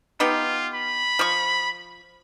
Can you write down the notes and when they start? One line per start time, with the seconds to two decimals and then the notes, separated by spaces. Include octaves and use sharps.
0.20 B3 D#4 F4 G4
0.74 B5
1.19 F3 C#6